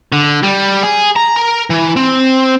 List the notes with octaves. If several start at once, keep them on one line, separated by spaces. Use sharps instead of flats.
D3
G3
G#4
A#5
A#4
E3
C4